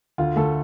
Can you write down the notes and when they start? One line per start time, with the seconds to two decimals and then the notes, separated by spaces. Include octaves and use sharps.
0.18 D2 F4
0.36 D2 A3 A4